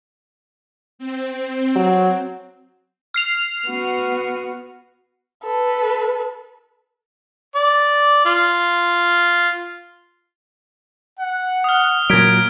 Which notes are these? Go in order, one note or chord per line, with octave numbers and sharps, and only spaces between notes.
C4
F#3
F6 C7 F7
B3 F#4
A4 B4
D5
F4
F#5
D#6 F6
A#2 F#3 A#4 G#6 B6 D7